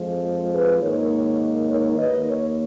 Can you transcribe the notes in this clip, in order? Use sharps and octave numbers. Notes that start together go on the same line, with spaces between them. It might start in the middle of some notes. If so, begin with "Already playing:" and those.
Already playing: F2 F3 G#3
G#4 B4
G#2 D#3 A#3 D#4 A#4 C#5
A#4 C#5
D#2 D#3 A#3 B4 D#5
A#4 C#5